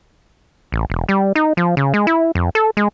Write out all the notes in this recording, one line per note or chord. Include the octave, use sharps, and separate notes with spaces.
A1
E1
G3
D#4
F3
C#3
G#3
E4
F2
A4
G#3